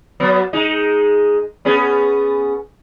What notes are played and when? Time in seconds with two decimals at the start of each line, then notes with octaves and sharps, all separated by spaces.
0.20 F#3 B3
0.53 G#3 D#4
1.65 B3 C#4 G#4